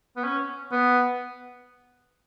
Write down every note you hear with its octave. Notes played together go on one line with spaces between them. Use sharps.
B3
C#4
B3